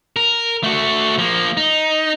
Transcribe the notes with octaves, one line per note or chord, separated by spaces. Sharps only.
A#4
A3 F#4
F3 A#3
D#4